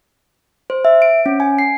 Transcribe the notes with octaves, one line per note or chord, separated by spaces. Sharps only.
C5
E5
D7
C#4
G#5
C7